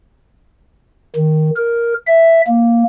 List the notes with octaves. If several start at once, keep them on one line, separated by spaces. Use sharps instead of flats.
D#3
A#4
E5
A#3